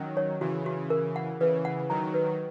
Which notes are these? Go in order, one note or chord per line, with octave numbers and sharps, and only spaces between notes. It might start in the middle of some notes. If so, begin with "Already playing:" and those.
Already playing: D#3 F#3 C#4
C#5
C#3 E3 F#4
F#4
A#4
F#5
C#3 E3 B4
F#5
D#3 F#3 A#5
B4